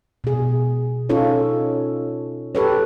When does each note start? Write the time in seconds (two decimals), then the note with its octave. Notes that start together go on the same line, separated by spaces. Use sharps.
0.24 B2 G#4
1.09 C#4 D#4 F4 A4 C#5
2.55 G4 A4 B4 C#5